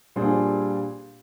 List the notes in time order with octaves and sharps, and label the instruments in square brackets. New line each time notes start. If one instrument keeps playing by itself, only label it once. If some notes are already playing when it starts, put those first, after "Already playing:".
[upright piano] A#2 G3 D4 G#4 C5